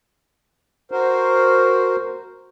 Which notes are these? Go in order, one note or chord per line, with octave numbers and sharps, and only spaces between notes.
F#4 A#4 C5